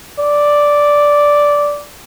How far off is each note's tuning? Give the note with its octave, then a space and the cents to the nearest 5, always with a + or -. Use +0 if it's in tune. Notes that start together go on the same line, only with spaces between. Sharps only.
D5 -5